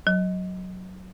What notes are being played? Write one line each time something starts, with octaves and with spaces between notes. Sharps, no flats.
F#3